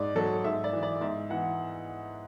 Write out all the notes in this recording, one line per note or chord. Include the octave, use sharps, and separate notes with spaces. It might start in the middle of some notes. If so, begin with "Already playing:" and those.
Already playing: G#2 D5
F#3 A4
G#2 E5
D5
E3
D5
G#2 E5
E3 F#5